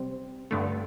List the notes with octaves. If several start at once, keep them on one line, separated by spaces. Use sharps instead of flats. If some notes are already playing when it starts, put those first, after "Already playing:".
Already playing: C3 G3 C4
G2 D3 A3